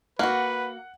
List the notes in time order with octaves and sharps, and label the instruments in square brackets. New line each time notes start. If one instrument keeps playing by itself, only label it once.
[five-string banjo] A#3 F#4 [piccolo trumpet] B4 [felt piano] F#5